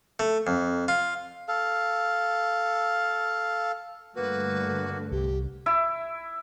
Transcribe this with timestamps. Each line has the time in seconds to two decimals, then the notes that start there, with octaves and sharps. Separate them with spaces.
0.19 A3
0.47 F2
0.88 F4
1.48 A4 F5
4.16 G2 D3 A3 A#3 F#4 B4
5.12 C2 G4
5.66 E4